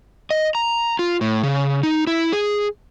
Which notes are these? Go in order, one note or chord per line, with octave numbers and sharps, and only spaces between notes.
D#5
A#5
F4
A2
C#3
D#4
E4
G#4